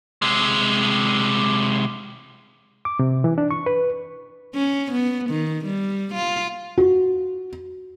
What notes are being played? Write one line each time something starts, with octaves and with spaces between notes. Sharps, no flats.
C3 G#3
D6
C3
E3
D4
C#6
B4
C#4
B3
D#3
G3
F4
F#4